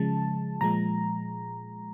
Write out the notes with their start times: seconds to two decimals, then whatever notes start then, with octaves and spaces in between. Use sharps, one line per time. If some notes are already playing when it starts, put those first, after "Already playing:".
Already playing: C#3 F3 G#3 A5
0.61 A#2 F3 G#3 A#5